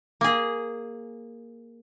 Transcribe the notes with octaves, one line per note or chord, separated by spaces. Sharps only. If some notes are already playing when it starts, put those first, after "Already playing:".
A#3 G#4